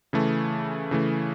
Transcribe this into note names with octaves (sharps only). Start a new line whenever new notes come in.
C#3 E3 A3
C#3 E3 A3